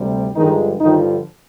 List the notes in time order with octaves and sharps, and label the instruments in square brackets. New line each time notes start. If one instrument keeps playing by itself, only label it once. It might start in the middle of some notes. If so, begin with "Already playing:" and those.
Already playing: [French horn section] D2 C3 G3
G2 D3 D#3 F3 G#3 D#4
G2 D3 D#3 F3 D#4